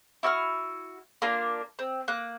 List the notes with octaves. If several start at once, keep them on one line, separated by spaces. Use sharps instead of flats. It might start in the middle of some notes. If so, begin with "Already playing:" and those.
E4 F#4 E6 F6
A#3 D4 F4
C4
A#3 F#6